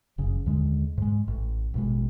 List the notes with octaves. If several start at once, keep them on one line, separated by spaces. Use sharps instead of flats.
F#1 C#3
D#2 D3 G#3
G#2 G#3
A1
A1 B2 G#3